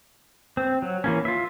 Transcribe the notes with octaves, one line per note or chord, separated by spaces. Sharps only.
C4
F#3
E3 A#3 C#4
F4 E5